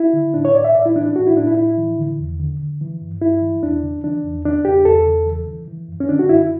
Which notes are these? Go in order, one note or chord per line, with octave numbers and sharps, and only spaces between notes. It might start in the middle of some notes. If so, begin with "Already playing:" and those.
Already playing: E4
D3
A2 D4
C#5
A2 D5
E5
A2 D5
E4
E3 D4
D4
A2 F#4
E4
A2 D4
E4
A2 E4
E3
D3
E2
D3
D3
E3
G2
G2 E4
E3
E2 D4
C#3
E3 D4
E2
C#3 D4
E2 G4
E2 A4
C#3
E3
E3
E3
F#2
C#4
D3 D4
F#4
F#2 E4